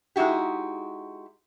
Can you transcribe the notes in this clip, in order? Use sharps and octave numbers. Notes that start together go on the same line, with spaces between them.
G#3 D#4 E4 F#4 G4